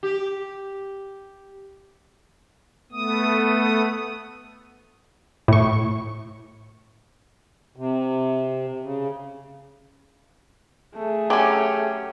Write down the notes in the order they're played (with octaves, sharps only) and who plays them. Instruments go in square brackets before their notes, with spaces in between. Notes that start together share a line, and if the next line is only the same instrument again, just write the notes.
[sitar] G4
[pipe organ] A3 B3 D#6
[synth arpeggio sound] A2 C#6
[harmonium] C3
C#3
[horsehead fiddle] A3 G#4
[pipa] F#3 C#4 [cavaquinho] G4